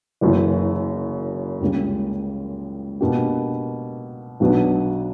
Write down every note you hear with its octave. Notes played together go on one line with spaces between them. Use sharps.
F#1 F#2 C#3 E3
C#2 C#3 G3 A#3 C#4
B2 A#3 D4 G4
B1 B2 F#3 B3 D4